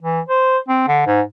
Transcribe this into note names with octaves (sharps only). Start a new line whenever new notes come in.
E3
C5
C4
D3
G#2